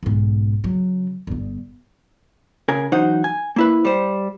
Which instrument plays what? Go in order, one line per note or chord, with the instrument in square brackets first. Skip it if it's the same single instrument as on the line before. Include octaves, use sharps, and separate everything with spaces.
[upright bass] B1 G#2
C#3 F#3
G1 G2
[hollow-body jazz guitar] C#3 A#4 G#5
F#2 E3 D#4 C5 F#5
G#5
A#3 E4 B4
G3 C5